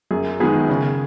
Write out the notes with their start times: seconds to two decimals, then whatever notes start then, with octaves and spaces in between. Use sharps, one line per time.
0.11 F#2 G#4
0.40 D#3 G#3 B3 G#4
0.69 C#3